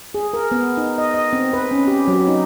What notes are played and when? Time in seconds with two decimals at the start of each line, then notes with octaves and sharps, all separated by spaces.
0.14 G#4
0.34 A#4
0.51 B3
0.77 D#4
0.98 D#5
1.14 D#5
1.33 C4
1.53 B4
1.71 C#4
1.88 G4
2.08 F#3
2.28 D#4